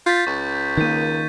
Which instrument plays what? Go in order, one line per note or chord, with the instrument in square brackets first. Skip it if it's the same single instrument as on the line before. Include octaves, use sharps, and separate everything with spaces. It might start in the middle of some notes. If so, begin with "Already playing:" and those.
[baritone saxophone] F4 [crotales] G6 A6 B6
[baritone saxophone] C#2 [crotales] C#6
[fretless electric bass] D#3 A#3 [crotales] G6 B6 D#7